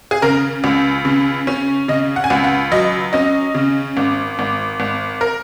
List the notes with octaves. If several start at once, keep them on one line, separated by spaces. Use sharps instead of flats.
G#4
C#3 A#4
C#2
C#3
C#4
C#3 D#5
F#5
G#5
C#2 F#5
F#5
F#3 D#5
C#4 D#5
C#3
G#1
G#1
G#1
A#4